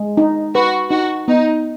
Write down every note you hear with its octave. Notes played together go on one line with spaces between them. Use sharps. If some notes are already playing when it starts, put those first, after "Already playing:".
Already playing: G#3
D#4
F#4 B4
D#4 F#4
B3 D#4